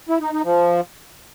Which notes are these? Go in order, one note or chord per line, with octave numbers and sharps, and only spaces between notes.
E4
D#4
D#4
F3